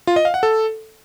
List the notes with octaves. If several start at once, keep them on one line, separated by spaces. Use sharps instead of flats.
F4
D#5
F5
F#5
A4